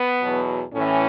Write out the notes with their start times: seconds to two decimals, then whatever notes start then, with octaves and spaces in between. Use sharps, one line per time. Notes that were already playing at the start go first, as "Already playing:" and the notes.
Already playing: B3
0.21 E2 B2 F#3
0.74 A2 E3 C#4